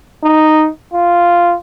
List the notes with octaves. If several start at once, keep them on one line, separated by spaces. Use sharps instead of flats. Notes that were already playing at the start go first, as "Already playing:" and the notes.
D#4
F4